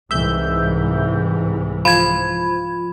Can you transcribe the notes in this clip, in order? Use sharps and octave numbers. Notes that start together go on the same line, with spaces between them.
C2 G#2 E3 E5 G6
F3 B5 G#6